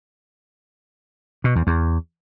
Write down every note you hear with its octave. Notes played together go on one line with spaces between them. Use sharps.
B2
E2
E2